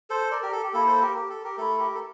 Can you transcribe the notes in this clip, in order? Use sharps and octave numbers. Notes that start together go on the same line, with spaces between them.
A4 C5
A#4 D5
G4 A#4
A4
G4
A#3 E4 A4
A4 C5
G4 A#4
G4
A4
G4 A#4
A3 E4 A4
G4 A#4
A4